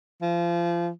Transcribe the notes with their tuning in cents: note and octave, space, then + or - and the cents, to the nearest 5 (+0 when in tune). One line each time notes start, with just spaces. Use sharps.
F3 -30